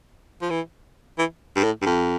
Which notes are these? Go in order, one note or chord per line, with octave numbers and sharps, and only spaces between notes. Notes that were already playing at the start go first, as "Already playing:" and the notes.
F3
E3
E3
G2
A2
G2
F2